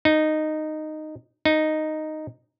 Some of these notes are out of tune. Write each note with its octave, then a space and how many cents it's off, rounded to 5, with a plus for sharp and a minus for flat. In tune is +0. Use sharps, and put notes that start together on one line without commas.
D#4 -10
D#4 -5